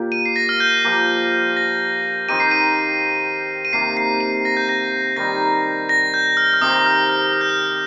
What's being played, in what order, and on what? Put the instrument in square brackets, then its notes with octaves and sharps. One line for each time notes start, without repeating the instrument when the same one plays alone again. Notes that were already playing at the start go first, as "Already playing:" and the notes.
Already playing: [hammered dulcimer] A#2 A#3 G4
[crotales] D#7
C7
A#6
F6
G6
[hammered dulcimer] F3 A#3 G4
[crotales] A#6
[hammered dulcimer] D#3 C4 D#4 G4 [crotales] D#7
[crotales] C7
D#7
D#7
[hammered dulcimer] C3 D#3 A#3 [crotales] C7
[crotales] C7
D#7
A#6
G6
A#6
[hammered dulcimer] D#3 G3 D#4 [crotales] A#6
[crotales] A#6
G6
F6
F6
[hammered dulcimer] C3 D#3 C4 G4 [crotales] D#6
[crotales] F6
F6
F6
G6
F6